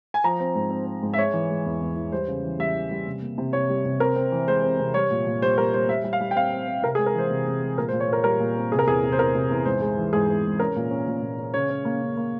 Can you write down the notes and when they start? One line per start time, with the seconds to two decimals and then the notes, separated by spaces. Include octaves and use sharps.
0.14 G#5
0.24 F3 A#5
0.40 C4
0.55 G#2
0.70 C4
0.86 C4
1.02 G#2
1.14 E5
1.17 G#3 C#5
1.33 E3
1.49 G#3
1.66 E2
1.81 E2
1.96 E3
2.12 G3 C5
2.28 C#3
2.44 E3
2.59 G3 E5
2.75 E3
2.91 G3
3.07 C3
3.22 A#3
3.38 C3
3.53 C3 C#5
3.70 G3
3.85 C3
4.00 C4 A#4
4.16 C4
4.32 E3
4.48 G#3 C5
4.63 C4
4.79 C3
4.94 G3 C#5
5.11 A#2
5.27 A#2
5.42 G3 C5
5.58 G3 A#4
5.74 G3 C5
5.88 G3 E5
6.04 G3
6.13 F5
6.20 G3
6.31 G5
6.36 C4 F5
6.52 C4
6.68 C4
6.83 C3 A#4
6.95 G#4
6.99 G#3
7.06 A#4
7.15 E3 C5
7.31 C3
7.47 C3
7.62 G#3
7.77 A#2 A#4
7.89 C5
7.93 A#2
8.00 C#5
8.08 A#2 A#4
8.24 G3 A#4
8.40 A#2
8.56 C4
8.72 C3 G#4
8.79 A#4
8.87 E2 G#4
9.04 C3
9.12 C5
9.18 E2 A#4
9.35 C3
9.51 E2
9.65 G#2 C5
9.82 G#3
9.97 E3
10.13 G#2 G#4
10.28 G#2
10.45 G#2
10.59 C#4 A#4
10.76 A#2
10.91 C#4
11.08 A#2
11.22 A#2
11.39 C#4
11.54 C#3 C#5
11.70 C#4
11.85 A#3
12.02 C#3
12.17 A#3